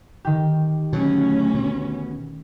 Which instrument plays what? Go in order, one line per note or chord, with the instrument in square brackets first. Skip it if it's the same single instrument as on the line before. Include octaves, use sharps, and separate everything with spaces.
[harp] D#3 G4
[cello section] D2 C#4 [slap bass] B2 F#3
[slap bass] B2